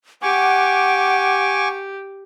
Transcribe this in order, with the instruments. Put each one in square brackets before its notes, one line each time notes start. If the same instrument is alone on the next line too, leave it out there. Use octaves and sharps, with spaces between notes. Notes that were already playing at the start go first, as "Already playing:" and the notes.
[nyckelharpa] G4 [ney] F#5 [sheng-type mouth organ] G#5 C#6 D6